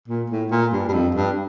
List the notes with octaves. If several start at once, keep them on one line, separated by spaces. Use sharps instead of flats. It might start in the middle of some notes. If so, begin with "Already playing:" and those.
A#2
A2
A#2
G2
G2
F2
G2